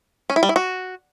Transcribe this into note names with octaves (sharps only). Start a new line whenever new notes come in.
C#4
E4
G3
E4
F#4